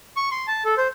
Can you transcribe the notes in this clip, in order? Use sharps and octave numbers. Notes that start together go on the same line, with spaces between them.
C#6
C6
A5
A4
C5